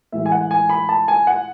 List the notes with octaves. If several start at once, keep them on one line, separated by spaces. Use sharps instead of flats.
A2 E3 G#3 E5
G#5
F#5
G#5
B5
A5
G#5
F#5